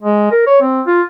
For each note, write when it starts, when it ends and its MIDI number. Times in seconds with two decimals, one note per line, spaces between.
0.02 0.28 56
0.32 0.43 70
0.47 0.60 73
0.62 0.81 60
0.87 1.02 65